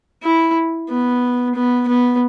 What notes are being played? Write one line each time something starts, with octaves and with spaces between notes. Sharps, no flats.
E4
B3
B3
B3